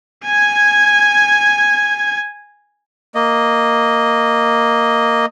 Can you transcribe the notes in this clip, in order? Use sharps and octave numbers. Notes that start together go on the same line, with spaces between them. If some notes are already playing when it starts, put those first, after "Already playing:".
G#5 G#6
A#3 D#5